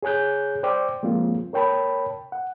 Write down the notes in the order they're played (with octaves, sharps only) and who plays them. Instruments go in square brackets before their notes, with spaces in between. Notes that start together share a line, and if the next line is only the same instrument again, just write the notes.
[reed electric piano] G#4 C#5 G#5 F#6 G6
C5 D5 G5 D6
F3 G#3 A#3 C4 F4
A#4 C#5 G5 A5 B5
F#5